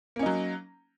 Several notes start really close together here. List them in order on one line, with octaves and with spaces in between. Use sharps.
A#3 C#4 D#4 F#3